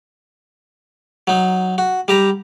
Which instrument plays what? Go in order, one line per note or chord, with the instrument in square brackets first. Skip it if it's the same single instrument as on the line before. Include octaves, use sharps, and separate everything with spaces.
[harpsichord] F#3 D#4
F#4
G3 G4 A#5